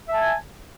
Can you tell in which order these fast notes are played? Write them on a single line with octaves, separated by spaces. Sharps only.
E5 A5 G#5